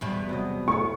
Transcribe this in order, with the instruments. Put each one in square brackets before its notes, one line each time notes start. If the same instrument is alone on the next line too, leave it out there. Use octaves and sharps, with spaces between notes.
[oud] E2 B2 G3
[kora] C3 F#3 D#5
[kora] A2 C3 [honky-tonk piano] C#6